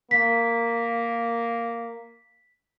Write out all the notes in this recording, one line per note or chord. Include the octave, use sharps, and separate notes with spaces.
A#3 B6